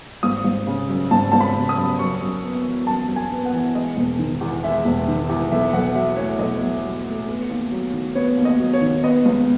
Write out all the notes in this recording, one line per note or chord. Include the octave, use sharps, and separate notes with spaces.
G#1 D#6
G#1
C#3
F#2
G#1 A5
G#1 A5
B5
C#3
D#6
F#2
F#2 C#6
F#2
B3
E3
F#2 A5
F#2
G#5
B3
F#5
E3
G#3 D#5
E1
D#3
E2
G#3 E5
E1
D#3
E2
B1 E5
B1 F#5
F#3 E5
A2 C#5
B1 D#5
B1
F#3
A2
B3
D#2
F#3
D#3
B3 C#5
D#2
D#5
F#3
C#5
D#3
B3 D#5
C#2